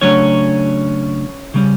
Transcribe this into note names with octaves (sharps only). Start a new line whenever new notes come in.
C#3 F#3 A3 C#4 D4 C#5
C#3 G3 C#4